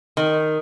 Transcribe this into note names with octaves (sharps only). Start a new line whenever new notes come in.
D#3